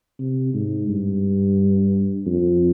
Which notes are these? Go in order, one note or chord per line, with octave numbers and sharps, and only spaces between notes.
C3
G#2
G2
F2